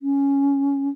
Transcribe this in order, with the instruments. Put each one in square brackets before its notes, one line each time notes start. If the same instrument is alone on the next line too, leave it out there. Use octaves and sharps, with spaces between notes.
[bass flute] C#4